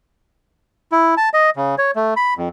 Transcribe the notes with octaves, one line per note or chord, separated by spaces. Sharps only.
E4
A5
D#5
C#3
C#5
A3
B5
F2